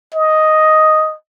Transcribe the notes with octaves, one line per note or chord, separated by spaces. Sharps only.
D#5